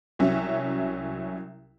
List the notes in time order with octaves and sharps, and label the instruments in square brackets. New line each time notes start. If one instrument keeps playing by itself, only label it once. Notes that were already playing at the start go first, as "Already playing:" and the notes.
[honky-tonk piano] C2 F#3 C#4 E5